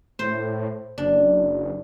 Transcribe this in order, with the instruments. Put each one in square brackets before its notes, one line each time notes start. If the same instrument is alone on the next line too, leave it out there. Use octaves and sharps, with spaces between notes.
[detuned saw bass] A2 [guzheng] C5
[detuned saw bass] F#1 [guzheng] D4